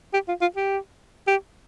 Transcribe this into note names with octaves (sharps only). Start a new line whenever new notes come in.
G4
F4
F4
G4
G4